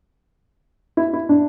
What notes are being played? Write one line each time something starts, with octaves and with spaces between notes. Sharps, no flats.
E4
E4
D4